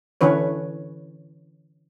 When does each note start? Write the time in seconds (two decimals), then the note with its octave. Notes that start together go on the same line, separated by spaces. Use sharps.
0.21 D3 E3 C#4 B4 C#5